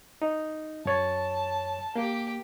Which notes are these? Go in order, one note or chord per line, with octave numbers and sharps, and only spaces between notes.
D#4
F#2 C#5 A5 A6
A#3 G4